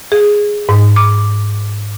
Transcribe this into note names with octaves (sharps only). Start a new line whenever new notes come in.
G#4
G#2
D6